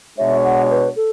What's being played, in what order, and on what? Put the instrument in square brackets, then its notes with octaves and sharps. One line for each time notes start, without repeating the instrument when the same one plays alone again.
[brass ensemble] B2 G#3 D4 F#4 C#5 [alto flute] E5
[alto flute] F#5
B4
A4